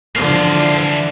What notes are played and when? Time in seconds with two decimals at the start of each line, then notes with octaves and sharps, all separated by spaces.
0.15 D3 E3 F3 F5